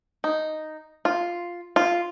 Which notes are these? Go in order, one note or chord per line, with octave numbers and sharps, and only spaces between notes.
D#4
F4
F4